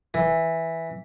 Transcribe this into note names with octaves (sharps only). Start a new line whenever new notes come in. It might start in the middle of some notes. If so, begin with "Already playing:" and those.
E3